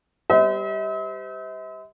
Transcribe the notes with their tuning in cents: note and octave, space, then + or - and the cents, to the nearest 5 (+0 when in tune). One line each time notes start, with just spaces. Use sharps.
G3 +0 C5 -40 E5 -45